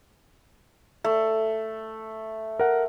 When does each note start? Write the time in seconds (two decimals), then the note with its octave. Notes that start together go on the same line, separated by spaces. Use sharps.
1.04 A3
2.60 A#4 F#5